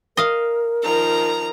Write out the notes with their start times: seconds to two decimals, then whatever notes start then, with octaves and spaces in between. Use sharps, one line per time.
0.17 A#4 D#5 F5
0.84 D#3 F3 A#5